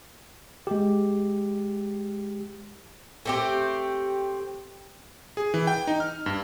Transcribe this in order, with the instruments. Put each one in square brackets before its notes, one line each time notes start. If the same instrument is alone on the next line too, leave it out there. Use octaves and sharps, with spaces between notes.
[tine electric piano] G#3 G4
[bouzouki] A3 C4 G4
[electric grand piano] G#4
E3
G5
D#4
F6
G2